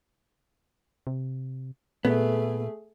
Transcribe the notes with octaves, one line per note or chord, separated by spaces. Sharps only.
C3
A#2 A3 B3 G#4